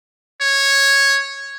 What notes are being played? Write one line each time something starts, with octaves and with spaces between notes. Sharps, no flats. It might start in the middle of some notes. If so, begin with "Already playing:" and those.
C#5